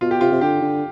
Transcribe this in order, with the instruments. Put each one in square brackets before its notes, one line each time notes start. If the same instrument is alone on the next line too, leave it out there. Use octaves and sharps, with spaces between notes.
[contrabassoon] B2 [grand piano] F4
[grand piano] G4
[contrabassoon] C3 [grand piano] F4
[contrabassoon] C3
[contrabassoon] D3 [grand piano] G4
[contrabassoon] D3